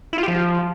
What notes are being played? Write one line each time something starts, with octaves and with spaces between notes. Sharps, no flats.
E4
F4
G4
F3